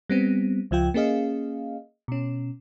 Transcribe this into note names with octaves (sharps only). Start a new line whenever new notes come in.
G3 B3 C4
C#2 F3 F4 G5
A#3 C#4 G#4 D#5 F5
B2 C#4